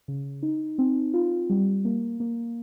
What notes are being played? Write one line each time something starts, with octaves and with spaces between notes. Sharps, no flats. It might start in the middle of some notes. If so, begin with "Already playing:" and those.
C#3
D#4
C4
F4
G3
A#3
A#3